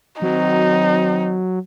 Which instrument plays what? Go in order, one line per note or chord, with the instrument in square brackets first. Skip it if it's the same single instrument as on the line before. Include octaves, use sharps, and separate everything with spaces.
[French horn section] D#3 C4 F#4 [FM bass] F#3 [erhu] D#4